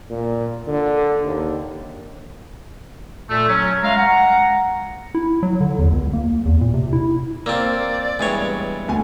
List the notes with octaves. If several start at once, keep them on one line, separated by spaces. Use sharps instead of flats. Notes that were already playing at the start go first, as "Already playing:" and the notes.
A#2
D3
D#2
A#2 A3
F#3 C#4
G#3 A3 F5 A#5
F#5 A#5
E4
F#3
D3
E2
C#2
A#3
E2
A#2
C3
E4
A#3 C4 C5 D5 E6
E2 G2 G#3 C#5
D2 G#5